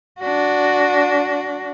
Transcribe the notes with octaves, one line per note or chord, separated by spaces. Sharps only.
D4 F#4